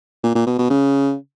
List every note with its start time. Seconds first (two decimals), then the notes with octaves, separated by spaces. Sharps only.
0.23 A#2
0.35 A#2
0.47 B2
0.59 B2
0.70 C#3